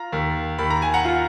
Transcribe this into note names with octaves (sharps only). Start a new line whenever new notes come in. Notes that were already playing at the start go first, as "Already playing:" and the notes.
Already playing: F4 A#5
D#2
D#2 B5
A#5
G#5
F#5 A#5
F4